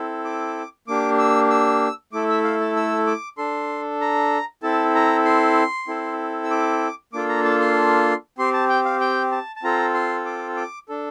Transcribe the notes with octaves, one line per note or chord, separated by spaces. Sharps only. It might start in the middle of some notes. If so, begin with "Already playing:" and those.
Already playing: C4 E4 A4
D6
A#3 D4 G4 D6
E6
E6
A3 E4 A4 D6
E5
F5
A5
E6
D6
D4 A4 C6
A#5
C4 E4 A4 A5
A#5
C6
C4 E4 A4
E6
D6
A#3 D4 F4 A4 D6
A#5
A5
C6
C4 G4 C6
A5
G5
F5
G5
A5
A5
C4 F4 A4 A#5
C6
D6
D6
D4 A4